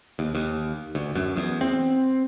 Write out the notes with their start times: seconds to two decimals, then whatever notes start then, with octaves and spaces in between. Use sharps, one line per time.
0.19 D#2
0.35 D#2
0.95 D2
1.15 F#2
1.37 E2
1.61 C4